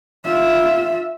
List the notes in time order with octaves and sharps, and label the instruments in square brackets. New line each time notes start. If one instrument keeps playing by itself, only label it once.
[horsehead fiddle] F4 E5